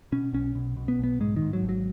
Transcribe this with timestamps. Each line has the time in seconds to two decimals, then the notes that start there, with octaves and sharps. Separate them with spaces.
0.12 B2 C#4
0.33 B1 C#4
0.55 B2
0.77 B2
0.88 B3
0.99 B1 B3
1.20 G#2 G#3
1.36 D#3
1.42 G#2
1.53 F#3
1.63 G#1
1.69 F#3